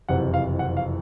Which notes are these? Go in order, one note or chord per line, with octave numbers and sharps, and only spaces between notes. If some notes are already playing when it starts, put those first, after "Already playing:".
F#1 F2 C3 E3 F#5
F5
F#5
F5